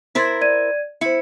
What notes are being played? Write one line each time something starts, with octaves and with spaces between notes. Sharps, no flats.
E4 A#4 C5 G#6 A6 B6
D5 G#6 D#7
E4 C5 C#7